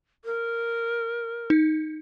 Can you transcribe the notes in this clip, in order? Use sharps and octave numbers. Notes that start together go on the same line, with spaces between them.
A#4
D#4